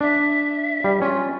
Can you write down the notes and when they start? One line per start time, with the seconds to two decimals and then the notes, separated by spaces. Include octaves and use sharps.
0.01 D4 E5
0.84 G3
1.02 C#4 F4